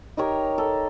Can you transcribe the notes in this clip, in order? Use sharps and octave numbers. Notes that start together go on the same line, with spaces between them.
D#4 G4 A#4 C#5
A4